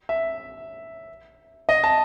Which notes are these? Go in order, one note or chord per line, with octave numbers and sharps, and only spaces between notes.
E5
D#5
A5